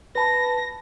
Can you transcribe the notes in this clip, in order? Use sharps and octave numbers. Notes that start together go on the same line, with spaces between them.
B4 A5 B5 A#6